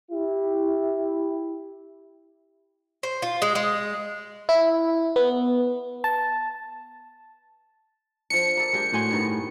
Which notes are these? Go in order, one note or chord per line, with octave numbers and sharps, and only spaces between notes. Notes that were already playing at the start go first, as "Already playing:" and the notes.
E4 G4
C5
F4
G#3
G#3
E4
B3
A5
F3 D4 C#7
A#3 A4
G#3 D4 G4
A2 F#4 G#5 C6
G2 D#3 B3